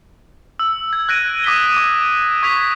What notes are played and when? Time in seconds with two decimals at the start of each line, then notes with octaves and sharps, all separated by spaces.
0.59 E6
0.93 G#6
1.09 F#6 G#6 A#6 D7 D#7
1.44 D6 D#6 B6 D#7 G7
1.76 D6
2.43 C#6 G#6 B6 F7